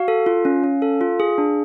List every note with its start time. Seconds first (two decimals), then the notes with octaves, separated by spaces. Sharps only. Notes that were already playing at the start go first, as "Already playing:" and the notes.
Already playing: F#4 F5
0.08 A4
0.26 F4
0.45 C#4
0.64 C#4
0.82 A4
1.01 F4
1.20 G#4
1.38 D4